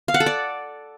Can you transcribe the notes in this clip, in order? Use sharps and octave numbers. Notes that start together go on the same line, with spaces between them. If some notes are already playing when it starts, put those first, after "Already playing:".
F5
F#5
A4
D5